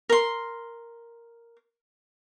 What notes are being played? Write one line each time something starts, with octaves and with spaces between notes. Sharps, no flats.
A#4 C6